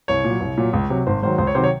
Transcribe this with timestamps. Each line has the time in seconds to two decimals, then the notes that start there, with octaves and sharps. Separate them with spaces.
0.08 C2 C#5
0.24 A#2
0.30 F#3
0.41 C2
0.58 A#2 F#3
0.73 C#2
0.90 C3 F#3
1.07 G#1 C5
1.22 G#2 D#3 F#3 C5
1.38 C#2 C5
1.47 C#5
1.55 C3 D#3 F#3 C5
1.64 C#5